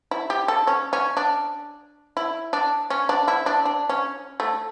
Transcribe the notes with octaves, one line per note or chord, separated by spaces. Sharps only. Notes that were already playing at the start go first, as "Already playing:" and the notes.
E4
G4
A4
C#4
C#4
D4
E4
D4
C#4
D4
E4
D4
D4
C#4
A3